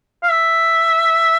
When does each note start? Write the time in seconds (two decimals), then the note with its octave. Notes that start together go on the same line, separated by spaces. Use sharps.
0.23 F5
0.29 E5